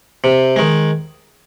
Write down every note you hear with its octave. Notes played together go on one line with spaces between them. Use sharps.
C3
D#3 G#3